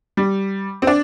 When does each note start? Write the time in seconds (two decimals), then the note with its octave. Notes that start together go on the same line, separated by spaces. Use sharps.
0.17 G3
0.82 C4
0.87 D4